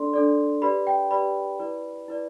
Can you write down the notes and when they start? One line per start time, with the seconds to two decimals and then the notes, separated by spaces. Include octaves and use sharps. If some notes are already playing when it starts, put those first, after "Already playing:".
Already playing: D4 A4 D5 C6
0.14 D4 A4 D5
0.62 G4 B4 D5 B5
0.87 G5
1.11 G4 B4 D5 B5
1.60 E4 B4 D5
2.08 E4 B4 D5